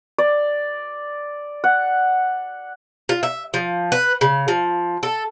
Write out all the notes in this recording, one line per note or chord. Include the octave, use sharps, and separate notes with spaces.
D5
F#5
F4
E5
F3
B4
C#3
F3
A4